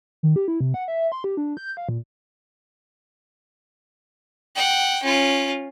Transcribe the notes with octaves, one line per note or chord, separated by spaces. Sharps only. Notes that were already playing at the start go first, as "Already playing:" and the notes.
D#3
G4
E4
C3
F#5
E5
C6
G4
D4
G6
F5
A#2
F#5 G5
C#4 F4